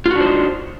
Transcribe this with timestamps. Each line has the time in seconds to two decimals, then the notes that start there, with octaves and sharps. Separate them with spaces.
0.06 F4
0.11 F#4
0.15 D4
0.20 C5
0.25 D#4